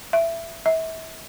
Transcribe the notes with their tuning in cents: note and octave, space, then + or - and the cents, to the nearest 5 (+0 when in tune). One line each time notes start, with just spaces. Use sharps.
E5 +15
E5 -35